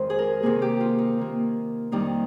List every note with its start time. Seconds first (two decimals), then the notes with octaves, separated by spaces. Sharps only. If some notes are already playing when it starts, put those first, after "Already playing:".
Already playing: F2 D#3 G#3 C5
0.10 G#4
0.18 A#4
0.43 C3 D#3 A#3 G#4
0.62 G4
0.81 F4
0.98 D#4
1.17 C3 D#3 A#3
1.92 F2 D#3 G3 A#3 D#4